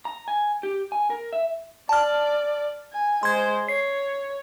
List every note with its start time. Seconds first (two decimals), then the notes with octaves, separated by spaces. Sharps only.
0.05 A#5
0.28 G#5
0.63 G4
0.92 G#5
1.10 A#4
1.33 E5
1.89 D5 A5 F6
2.93 G#5
3.23 G#3 C5 C6 G#6
3.68 C#5 C7